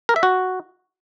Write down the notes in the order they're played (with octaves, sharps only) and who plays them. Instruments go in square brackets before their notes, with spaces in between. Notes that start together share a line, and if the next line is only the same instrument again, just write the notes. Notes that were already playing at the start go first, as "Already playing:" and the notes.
[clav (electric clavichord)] A#4
E5
F#4